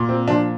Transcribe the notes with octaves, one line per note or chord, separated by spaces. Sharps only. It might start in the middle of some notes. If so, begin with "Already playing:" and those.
Already playing: A#2
C4
A#2 F3 D4